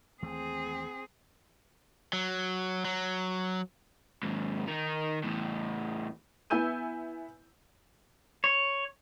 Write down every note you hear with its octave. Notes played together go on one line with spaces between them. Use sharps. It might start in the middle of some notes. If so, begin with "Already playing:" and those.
D#2 E3 A3 C4 G#4
F#3
F#3
D#2 G#2
D#3 D#4
E2 A2
B3 E4 G#5 E6 G6 D#7
C#5